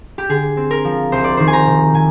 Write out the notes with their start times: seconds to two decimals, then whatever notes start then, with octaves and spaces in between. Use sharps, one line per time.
0.18 G4
0.29 D3 G#4
0.57 C4
0.71 A#4
0.84 F3
1.12 C2 C5
1.24 D5
1.37 D#3 C5
1.48 G#5
1.53 A#5
1.66 C3
1.94 C3 G#5